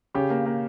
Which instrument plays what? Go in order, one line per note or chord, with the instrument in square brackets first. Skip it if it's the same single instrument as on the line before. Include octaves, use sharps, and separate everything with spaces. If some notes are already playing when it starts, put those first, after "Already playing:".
[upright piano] C#3 [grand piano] G4
[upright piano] A#3
A#3